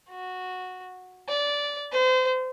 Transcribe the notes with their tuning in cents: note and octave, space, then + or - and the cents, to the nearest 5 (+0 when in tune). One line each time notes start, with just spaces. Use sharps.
F#4 -10
D5 -15
C5 -35